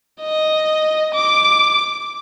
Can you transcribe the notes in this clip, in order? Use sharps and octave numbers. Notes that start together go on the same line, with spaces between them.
D#5
D6